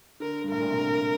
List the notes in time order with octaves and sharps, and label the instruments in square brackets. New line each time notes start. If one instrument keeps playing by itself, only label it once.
[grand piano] D3 [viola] A#4
[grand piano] G2
[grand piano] A2 [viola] A#4
[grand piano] A#2
C3
D3